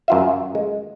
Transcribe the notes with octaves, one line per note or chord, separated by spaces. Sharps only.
F#2 F4 E5
G#3